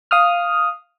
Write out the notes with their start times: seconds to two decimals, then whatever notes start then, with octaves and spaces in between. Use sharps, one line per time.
0.11 F5 D#6 F6